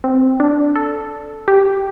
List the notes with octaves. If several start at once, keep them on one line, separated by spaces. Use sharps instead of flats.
C4
D4
A4
G4